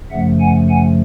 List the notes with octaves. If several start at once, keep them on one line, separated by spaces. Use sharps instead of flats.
F#2 C#3 F3 A3 E5 F#5
F#5 G#5
F#5 G#5